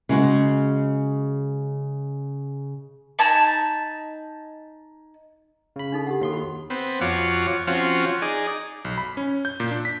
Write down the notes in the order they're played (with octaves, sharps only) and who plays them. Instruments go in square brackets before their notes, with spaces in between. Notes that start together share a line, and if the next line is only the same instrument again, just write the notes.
[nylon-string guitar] C#3 G#3 F#4
[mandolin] D#4 G#5 A5 B5
[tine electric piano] C#3 B5
[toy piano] D4 D#4 A4
G4 A4 F#5
[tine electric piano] D#2 C6 [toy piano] F#4 A4
[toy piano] F#4 B5
[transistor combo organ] B3 C4
F2 F4 F#4 C#5 D6
F3 C4 C#4 F4 F#4
D#4 G#4 D5
[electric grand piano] B1
B5
C#4
G6
A#2
D4
B6